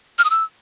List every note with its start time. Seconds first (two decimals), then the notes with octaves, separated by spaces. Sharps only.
0.19 F6
0.24 D#6
0.30 E6